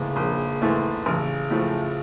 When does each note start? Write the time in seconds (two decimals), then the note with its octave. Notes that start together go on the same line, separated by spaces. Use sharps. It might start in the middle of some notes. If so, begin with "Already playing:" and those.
Already playing: A#1 G#2 C#3 E3 A3
0.16 A#1
0.62 G#2 E3 A3
1.06 A1 C#3
1.51 A2 F3 A3